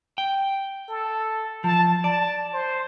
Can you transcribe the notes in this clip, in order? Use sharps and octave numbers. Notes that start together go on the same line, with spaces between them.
G5
A4
F3 A5
D5 A5
C5